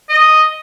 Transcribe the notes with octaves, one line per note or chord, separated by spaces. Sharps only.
D#5